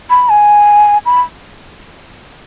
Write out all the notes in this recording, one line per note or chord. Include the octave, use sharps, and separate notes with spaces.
B5
G#5
B5